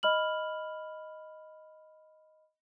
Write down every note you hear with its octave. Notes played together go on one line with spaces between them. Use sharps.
D#5 B5 F6 F#7